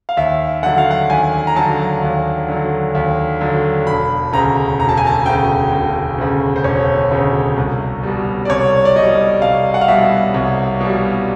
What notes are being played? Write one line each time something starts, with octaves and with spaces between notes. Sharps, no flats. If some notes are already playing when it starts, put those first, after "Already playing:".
F5
D#2 E5
D3 F#3 F#5
F5
F#5
D#2 G#5
A#5
D3 F#3 A5
D#2
D3 F#3
D#2
D3 F#3
E1 B5
D2 C#3 A#5
E1 A#5
A5
G#5
A5
D2 C#3 G5
E1
D2 C#3
C5
E1 C#5
D2 C#3
C2
B2 G3
D5
C2 C#5
D5
B2 G3 D#5
C2 F5
F#5
F5
B2 G3 E5
C2
B2 G3